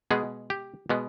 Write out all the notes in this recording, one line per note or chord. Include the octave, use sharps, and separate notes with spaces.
B2 G#3 B3 G#4
G4
B2 G#3 B3